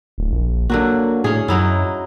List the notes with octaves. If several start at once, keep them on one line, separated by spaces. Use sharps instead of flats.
D1
A#1
D3 F#3 A#3 F#4
A2 C#4 G#4
F#2 F#3 D#4 E4